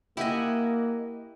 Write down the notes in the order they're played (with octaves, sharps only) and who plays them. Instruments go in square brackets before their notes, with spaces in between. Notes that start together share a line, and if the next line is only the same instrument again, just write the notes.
[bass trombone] A#3 [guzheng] E4 D#5 [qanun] G4 F#5 G#5